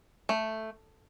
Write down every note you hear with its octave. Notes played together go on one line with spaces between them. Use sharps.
A3